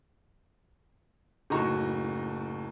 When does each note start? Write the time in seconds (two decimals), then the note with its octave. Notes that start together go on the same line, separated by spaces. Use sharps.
1.50 F#1 A2 D#4 F#4 A#5 C#6